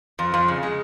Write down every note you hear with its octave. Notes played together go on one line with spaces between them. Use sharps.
F2
F2
C#3
G#3